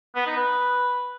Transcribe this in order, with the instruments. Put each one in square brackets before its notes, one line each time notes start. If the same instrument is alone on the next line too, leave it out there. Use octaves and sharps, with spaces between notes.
[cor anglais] B3
D#4
B4